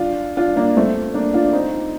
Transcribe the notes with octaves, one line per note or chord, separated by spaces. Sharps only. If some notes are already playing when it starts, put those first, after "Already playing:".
Already playing: D4 F4
D4 F4
A#3 D4
A3 C4
A#3 D4
D4 F4
C4 D#4